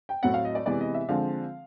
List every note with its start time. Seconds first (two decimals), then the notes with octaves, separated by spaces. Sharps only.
0.09 G5
0.23 A2 F#3 A3 C4 F#5
0.34 F5
0.45 D#5
0.55 D5
0.66 C3 E3 G#3 B3 D5
0.80 D#5
0.94 E5
1.08 D3 F3 G#3 C4 F5